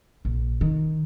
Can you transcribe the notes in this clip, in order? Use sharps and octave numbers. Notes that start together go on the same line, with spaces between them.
A#1
D#3